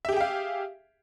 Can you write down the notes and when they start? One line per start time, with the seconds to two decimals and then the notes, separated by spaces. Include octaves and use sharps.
0.05 E5
0.09 G4
0.13 G#4
0.17 G5
0.21 F5